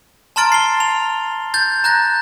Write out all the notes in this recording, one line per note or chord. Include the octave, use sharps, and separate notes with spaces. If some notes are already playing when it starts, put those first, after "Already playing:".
A5 A#5 C6 F6 A6 D7
C7 G7
F7
G6 A6
A#5 F#6 G6 A#6